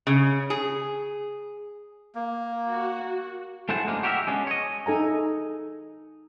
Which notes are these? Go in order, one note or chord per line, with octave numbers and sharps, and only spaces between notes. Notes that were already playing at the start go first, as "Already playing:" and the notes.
C#3
G#4
A#3
F#4
A3 E4 G#4 C5 F#5 A5
F#2 G#3 A#3 D4
F#4 G4 A#4 C#5 E5
G#3 B3 C#4 D4
C#5 D#5
D#4 A4 G#5 A#5